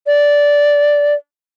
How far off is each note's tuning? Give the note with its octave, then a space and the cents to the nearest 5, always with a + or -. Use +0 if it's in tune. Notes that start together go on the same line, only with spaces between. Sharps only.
D5 -10